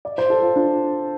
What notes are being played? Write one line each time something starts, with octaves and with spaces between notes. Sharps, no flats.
D5
C5
A4
F4
D4